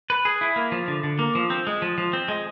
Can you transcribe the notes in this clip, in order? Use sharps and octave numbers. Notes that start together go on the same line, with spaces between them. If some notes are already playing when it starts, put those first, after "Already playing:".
B4
G#4
E4
A#3
F3
D3
D3
A#3
F3
C4
G#3
F3
F3
C4
G#3